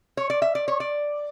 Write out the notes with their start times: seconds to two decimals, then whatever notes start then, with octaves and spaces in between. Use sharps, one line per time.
0.17 C#5
0.30 D5
0.42 E5
0.55 D5
0.68 C#5
0.80 D5